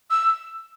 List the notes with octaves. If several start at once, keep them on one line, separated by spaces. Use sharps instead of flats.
E6